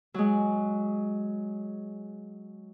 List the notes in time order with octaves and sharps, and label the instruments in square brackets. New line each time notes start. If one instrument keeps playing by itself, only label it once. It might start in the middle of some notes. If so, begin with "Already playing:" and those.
[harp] F#3 G#3